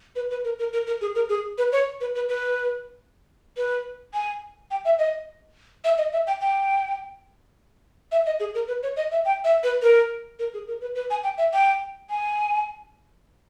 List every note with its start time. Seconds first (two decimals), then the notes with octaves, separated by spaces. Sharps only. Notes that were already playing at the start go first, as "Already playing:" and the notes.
0.16 B4
0.31 B4
0.44 A#4
0.59 A#4
0.73 A#4
0.87 A#4
1.01 G#4
1.15 A#4
1.29 G#4
1.58 B4
1.72 C#5
2.01 B4
2.15 B4
2.29 B4
3.57 B4
4.14 G#5
4.71 G5
4.85 E5
4.99 D#5
5.84 E5
5.98 D#5
6.13 E5
6.27 G5
6.41 G5
8.12 E5
8.26 D#5
8.40 G#4
8.55 A#4
8.68 B4
8.83 C#5
8.97 D#5
9.12 E5
9.25 G5
9.44 E5
9.64 B4
9.82 A#4
10.39 A#4
10.54 G#4
10.68 A#4
10.81 B4
10.95 B4
11.10 G#5
11.24 G5
11.38 E5
11.53 G5
12.10 G#5